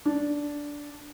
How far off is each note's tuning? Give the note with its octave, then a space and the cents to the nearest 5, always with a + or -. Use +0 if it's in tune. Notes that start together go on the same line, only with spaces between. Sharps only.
D4 -10